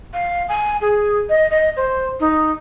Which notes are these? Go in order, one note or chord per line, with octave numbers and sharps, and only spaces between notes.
F5
G#5
G#4
D#5
D#5
C5
D#4